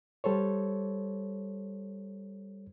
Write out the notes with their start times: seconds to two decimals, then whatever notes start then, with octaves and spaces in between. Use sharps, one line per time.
0.24 G3 A4 C5 C#5